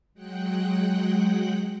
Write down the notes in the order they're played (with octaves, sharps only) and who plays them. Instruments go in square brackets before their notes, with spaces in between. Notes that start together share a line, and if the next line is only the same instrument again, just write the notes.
[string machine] F#3 G#3 F#5 G5 F#6